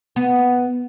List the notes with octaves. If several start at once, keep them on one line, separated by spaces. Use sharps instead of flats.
B3